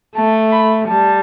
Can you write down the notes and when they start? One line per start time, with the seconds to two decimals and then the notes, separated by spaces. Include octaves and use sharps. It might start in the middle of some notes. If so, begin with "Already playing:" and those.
0.15 A3 A5
0.52 B5
0.89 G3 A5